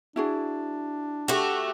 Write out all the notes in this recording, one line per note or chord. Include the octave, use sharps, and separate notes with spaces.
D4 E4 F#4 G#4
A3 F#4 G4